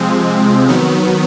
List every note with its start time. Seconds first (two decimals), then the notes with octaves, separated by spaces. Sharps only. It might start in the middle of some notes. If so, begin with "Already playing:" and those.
Already playing: C3 F3 G#3 C4
0.68 D#3 F#3 B3